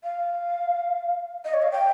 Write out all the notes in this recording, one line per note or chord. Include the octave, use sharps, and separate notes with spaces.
F5
D#5
C#5
F5
G5